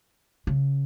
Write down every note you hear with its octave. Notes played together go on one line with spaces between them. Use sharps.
C#3